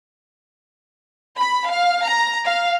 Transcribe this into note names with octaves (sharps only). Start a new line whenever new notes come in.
B5
F5
A#5
F5